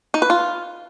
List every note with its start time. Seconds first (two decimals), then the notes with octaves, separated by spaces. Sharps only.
0.14 D#4
0.22 B4
0.30 F4